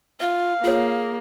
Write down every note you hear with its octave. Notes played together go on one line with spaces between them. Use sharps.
F4 E5 F5
A#3 F4 G#4 C#5